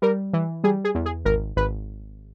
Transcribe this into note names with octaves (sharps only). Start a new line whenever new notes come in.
G3 A#4
E3
G3 G#4
G#4
E2
G#4
G#1 A#4
G#1 B4